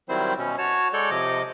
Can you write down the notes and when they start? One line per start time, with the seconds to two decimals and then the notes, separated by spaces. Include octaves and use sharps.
0.09 D#3 F#3 G3 C4 E4 C5
0.39 B2 C#4
0.58 F#4 C#5 A5
0.93 G#3 A4 C#5 D5 G6
1.10 C3 F3 D#5 D6